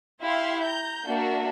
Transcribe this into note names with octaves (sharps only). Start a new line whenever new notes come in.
E4 G4 E5 F5 C6
A#5 G6
A#3 D4 F#4 E5